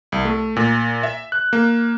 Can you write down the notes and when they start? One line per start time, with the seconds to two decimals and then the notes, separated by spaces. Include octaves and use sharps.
0.12 C2
0.25 A3
0.56 A#2
1.03 E5
1.32 F#6
1.53 A#3